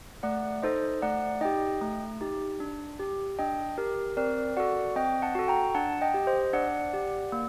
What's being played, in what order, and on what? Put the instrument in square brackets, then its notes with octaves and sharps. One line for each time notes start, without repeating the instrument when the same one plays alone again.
[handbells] A3 D5 F#5
D#4 A4 C5 D#5
A3 D5 F#5
D#4 G4 D#5 G5
A3
D#4 G4
D4
G4
D4 D#5 G5
G4 A#4
C4 A#4 D5
F#4 A4 D5 F#5
C4 D#5 G5
F#5 A5
F#4 A4
G5 A#5
D4 F#5 A5
D#5 G5
G4
C5 D#5
D4 D5 F#5
G4
A#3